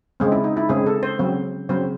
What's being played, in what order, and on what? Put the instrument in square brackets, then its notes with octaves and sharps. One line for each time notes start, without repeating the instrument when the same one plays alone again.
[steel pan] C#3 G#3 C4
E4
D#4
E4
C#3 G#3 C4 G#4
A4
C5
C#3 F#3 C4
C#3 F#3 C4 C5